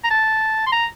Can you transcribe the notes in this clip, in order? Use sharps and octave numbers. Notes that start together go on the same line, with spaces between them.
A#5
A5
C6
A#5